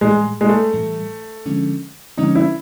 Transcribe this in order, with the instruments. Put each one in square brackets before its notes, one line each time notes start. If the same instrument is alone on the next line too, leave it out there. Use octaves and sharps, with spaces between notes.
[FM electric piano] A2 E3 G3 [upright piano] G#3
[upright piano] G#3
A3
[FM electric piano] A2 E3 G3
D3 F3 G#3 C#4
[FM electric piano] D3 F3 G#3 C#4 [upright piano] D#4
[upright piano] E4